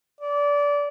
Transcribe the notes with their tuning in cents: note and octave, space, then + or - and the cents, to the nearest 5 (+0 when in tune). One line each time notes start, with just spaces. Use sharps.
D5 -20